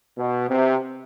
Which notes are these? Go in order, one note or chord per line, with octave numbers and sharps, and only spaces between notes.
B2
C3